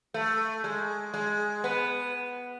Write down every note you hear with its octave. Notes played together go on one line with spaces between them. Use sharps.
A3
G#3
G#3
B3